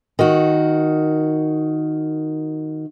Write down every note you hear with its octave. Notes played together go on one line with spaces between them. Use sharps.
D#3 F#4